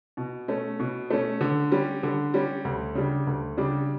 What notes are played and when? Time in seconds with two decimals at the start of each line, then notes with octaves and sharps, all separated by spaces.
0.17 B2
0.48 A3 C#4
0.79 B2
1.10 A3 C#4
1.41 D3
1.72 G3 C#4
2.03 D3
2.34 G3 C#4
2.65 D2
2.95 C#3 G3 D4
3.27 D2
3.57 C#3 G3 D4